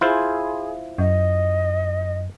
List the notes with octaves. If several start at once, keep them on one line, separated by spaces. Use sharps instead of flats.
E4 F4 G#4 C5
F#2 D#5